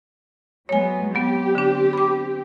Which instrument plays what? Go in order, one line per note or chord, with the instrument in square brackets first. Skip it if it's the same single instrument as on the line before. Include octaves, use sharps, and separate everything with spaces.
[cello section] F#3 G#3 B3 [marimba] C#5 G#5
[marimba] F#3 B3 [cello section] C4 G4
[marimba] D3 D4
B5 D6